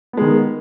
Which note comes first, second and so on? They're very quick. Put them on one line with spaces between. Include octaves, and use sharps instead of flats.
B3 G#3 D#3